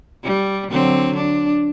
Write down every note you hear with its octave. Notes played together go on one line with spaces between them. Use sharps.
G3
D3 F#3 C4
D4